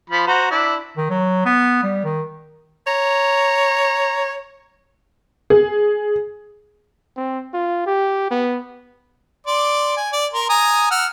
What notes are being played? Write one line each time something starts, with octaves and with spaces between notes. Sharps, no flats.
F3 B5
F#4 C5 A#5
D4 E4 D5
D#3
F#3
B3
G3
D#3
C#5 A#5
G#4
C4
F4
G4
B3
D5 C6 D6
G#5
D5
A#4 C6
G#5 A#5 D#6
F#5 E6 F6